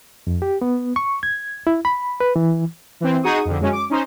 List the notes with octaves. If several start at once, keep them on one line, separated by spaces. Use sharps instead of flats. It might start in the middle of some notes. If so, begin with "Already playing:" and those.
F2
G4
B3
C#6
G#6
E4
B5
B4
E3
E3 C4
D#4 F#4 G#4 C#6 D#6
F2 D3
F#2 G#3 C#4 F#4
D6
C#4 D#4 C5